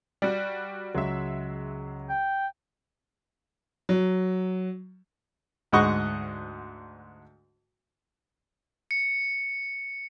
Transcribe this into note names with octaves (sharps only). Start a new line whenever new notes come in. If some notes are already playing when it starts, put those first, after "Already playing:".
G3 F#4 D5
C#2 F#3 G#3 E5
G5
F#3
D2 G#2 G#3 D#5 F#5 C#6
C#7